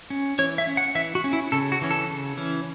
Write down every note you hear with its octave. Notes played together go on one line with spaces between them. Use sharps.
C#4
E3 C#5
E5
C#4
F#5
E3 E5
F#4
C#4
E4
C#3 A4
F#4
E3 C#4
A4
C#3
E3 C#4